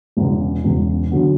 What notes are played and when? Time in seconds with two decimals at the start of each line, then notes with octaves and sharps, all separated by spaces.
0.17 E1 E2 C#3
0.64 E1 E2 C#3
1.11 D3 F#3 B3